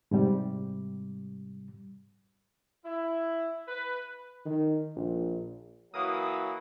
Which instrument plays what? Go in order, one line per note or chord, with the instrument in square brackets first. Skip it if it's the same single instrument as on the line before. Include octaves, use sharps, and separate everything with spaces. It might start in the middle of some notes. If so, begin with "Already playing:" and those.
[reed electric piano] G#2 C3 G3
[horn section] E4
B4
[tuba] D#3
A#1
[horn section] E3 F#3 A#3 [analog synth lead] D#6